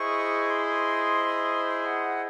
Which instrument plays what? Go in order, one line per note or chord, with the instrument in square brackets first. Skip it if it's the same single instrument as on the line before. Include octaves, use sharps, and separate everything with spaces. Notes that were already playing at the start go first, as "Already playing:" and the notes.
Already playing: [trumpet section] E4 G#4 C5 D#5 [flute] C#6
[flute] C6
F#5